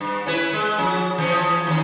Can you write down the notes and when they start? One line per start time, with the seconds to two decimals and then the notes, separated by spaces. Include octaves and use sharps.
0.01 G2
0.26 C#4 E4 B4
0.53 G#3
0.78 F3 C#4
1.18 E3 F3 C#4
1.67 D#2 C#4